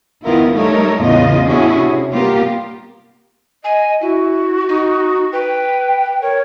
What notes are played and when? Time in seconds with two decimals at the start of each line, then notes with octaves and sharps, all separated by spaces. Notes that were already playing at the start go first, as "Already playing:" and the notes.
0.24 E2 D#3 B3 E4 F4 A#4
0.53 G3 A3 D#4 A4 A#4 C#5
1.01 E2 A2 C#3 A3 F4 D#5
1.47 B3 C#4 D4 E4 F#4 G#4
1.78 C3
2.11 G3 A#3 B3 F4 G4 A#4
3.64 D#5 G#5
4.01 E4 F#4
4.69 D#4
5.33 B4 G5
6.22 A#4 C#5